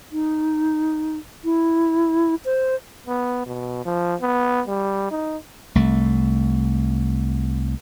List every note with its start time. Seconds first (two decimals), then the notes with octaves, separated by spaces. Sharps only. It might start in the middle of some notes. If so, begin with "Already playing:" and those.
0.12 D#4
1.44 E4
2.45 C5
3.07 B3
3.46 B2
3.85 F3
4.21 B3
4.67 G3
5.11 D#4
5.75 C2 A3